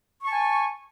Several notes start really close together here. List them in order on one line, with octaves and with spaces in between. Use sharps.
C#6 A5 G#5